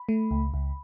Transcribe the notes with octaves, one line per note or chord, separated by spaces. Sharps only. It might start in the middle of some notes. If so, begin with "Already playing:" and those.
Already playing: B5
A3
C#2
C#2